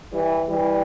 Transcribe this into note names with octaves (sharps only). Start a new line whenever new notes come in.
E3 G3
E3 G3